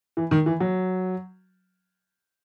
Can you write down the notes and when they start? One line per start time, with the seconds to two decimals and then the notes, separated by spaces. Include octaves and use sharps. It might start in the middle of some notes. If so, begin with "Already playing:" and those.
0.17 E3
0.31 D#3
0.46 E3
0.60 F#3